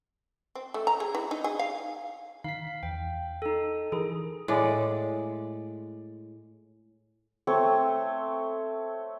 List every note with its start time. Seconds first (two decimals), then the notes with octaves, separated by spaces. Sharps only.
0.55 C4
0.74 A3
0.87 A#5
1.00 G#4
1.15 E3
1.31 D#4
1.44 G#4
1.59 F5
2.44 D#3 F5 B6
2.83 E2 G5
3.42 D#4 A4
3.92 E3 G#4 A#4
4.48 A2 G#3 D5
7.47 A3 C4 C#5